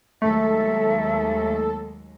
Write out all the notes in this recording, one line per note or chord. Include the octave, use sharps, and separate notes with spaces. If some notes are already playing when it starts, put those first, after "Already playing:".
D#2 F#3 G#3 A3 A4 E5